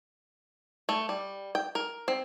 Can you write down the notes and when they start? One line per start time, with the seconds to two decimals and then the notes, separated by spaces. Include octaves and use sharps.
0.89 A3
1.09 G3
1.55 G5
1.75 A#4
2.08 C4